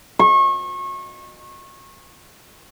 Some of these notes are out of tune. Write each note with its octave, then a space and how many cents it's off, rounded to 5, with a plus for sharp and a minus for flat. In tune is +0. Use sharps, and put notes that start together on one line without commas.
C#6 -30